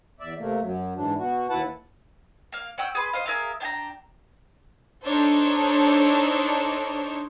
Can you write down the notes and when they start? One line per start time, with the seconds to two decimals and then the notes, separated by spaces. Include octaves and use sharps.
0.20 E2 D5 E5
0.39 C3 A3 A#3
0.62 F#2 F#3
0.96 G#2 E3 D4
1.19 B2 F#4
1.50 D#2 E4 B4 F#5 A5
2.52 A#3 F5
2.78 C#4 F#5 G5 E6
2.95 G#4 B4 C6
3.13 C5 D#5 F5
3.26 G#4 A#4 E5 F5
3.60 D4 G5 G#5 A#5
5.05 D4 D#4 A4 C5 C#5